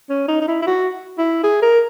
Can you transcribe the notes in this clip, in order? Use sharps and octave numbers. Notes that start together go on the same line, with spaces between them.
C#4
D#4
D#4
E4
E4
F#4
E4
G#4
A#4